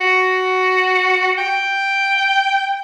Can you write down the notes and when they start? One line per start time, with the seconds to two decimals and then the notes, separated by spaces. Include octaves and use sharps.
0.01 F#4
1.38 G5